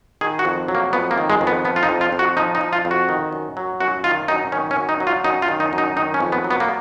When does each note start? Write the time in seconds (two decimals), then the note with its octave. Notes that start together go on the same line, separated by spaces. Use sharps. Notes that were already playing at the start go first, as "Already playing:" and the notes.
0.21 D#3 G#4
0.39 F#4
0.45 F2
0.68 F#3
0.75 A#3
0.93 F2 B3
1.11 A#3
1.18 D#3
1.30 G#3
1.41 F2
1.47 B3
1.65 F3 B3
1.76 F4
1.83 D#4
1.89 F2
2.01 F4
2.12 F2
2.19 F#4
2.37 F3 D#4
2.55 D#4
2.61 F3
2.73 F4
2.85 F2
2.91 F#4
3.09 D#3
3.33 F#2
3.57 F#3
3.80 F#2 F#4
4.04 D#3 F4
4.28 F#2 D#4
4.52 D#3 C#4
4.71 C#4
4.76 F#2
4.89 D#4
5.00 F#3
5.07 F4
5.24 F#2 D#4
5.42 F4
5.48 D#3
5.60 D#4
5.73 F#2
5.78 D#4
5.97 D#3 D#4
6.14 C#4
6.20 F2
6.32 B3
6.44 F#3
6.51 B3
6.60 A#3